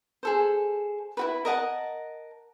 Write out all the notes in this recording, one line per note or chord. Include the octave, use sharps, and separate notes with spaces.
G#4 A4 C5
E4 F#4 B4
A#4 D#5 F#5 A5